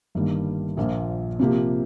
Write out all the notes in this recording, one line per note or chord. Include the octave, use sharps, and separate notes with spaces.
G1 G2 D#3 G3 A#3
A#1 A#2 F3 A#3
C3 F3 A#3 G4